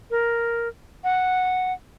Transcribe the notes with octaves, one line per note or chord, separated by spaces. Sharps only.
A#4
F#5